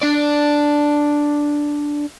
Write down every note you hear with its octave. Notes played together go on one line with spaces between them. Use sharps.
D4 D5